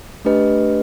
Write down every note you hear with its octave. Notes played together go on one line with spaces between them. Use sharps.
A3 D4 G4 B4 D#5